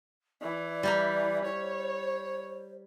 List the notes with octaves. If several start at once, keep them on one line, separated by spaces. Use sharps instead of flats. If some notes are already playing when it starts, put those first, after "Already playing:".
E3 D5
G3 G4 A#5
C5 C#5